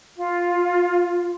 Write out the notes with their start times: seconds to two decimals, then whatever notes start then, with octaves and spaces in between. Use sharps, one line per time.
0.16 F4